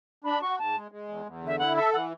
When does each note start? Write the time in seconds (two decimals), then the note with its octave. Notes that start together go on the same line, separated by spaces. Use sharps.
0.24 D4 B5
0.41 F#4 C#6
0.59 G#2 A5
0.76 G#3
0.91 G#3
1.09 E2
1.26 E2
1.43 D3 E5
1.59 E4 F#5
1.76 A4 E5
1.93 E3 F#5